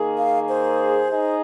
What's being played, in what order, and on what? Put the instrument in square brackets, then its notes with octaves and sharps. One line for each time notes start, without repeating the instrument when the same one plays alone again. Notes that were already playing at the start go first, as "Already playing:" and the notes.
Already playing: [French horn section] D#3 A#3 G#4
[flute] F5
C5
[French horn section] D#4 G#4